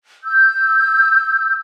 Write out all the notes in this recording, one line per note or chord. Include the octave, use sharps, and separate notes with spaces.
E6 G6